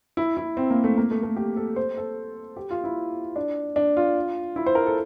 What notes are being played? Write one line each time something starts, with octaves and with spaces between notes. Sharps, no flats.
E4
E4
C4
A#3
A3
A#3
A3
A3
G4
A4
C5
A4
G4
F4
E4
D4
D4
F4
E4
C5
A#4
A4